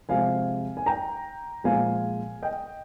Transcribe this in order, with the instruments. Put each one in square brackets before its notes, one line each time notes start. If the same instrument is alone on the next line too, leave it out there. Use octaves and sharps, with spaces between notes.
[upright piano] C3 F3 G#3 F5 G#5
G#5
G5 A#5
A#2 F3 G#3 F5 G#5
D#5 G5